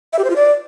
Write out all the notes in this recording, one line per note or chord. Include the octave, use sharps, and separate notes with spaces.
E5
G4
C5
F4
D5